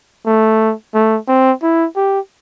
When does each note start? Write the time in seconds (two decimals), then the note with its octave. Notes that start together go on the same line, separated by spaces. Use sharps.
0.26 A3
0.94 A3
1.28 C4
1.62 E4
1.96 G4